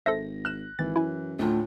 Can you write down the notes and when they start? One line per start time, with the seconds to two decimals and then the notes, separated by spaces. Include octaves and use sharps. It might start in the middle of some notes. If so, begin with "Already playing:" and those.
0.06 G#1 A4 C5 E5 A#6
0.45 F6 F#6 E7
0.79 G#1 E3 A6
0.96 F#2 E4 G#5
1.39 D2 A2 F4